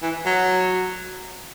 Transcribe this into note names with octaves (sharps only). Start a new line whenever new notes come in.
E3
F#3